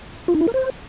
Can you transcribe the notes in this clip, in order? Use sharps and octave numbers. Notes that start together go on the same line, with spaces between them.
F4
D#4
E4
A#4
C5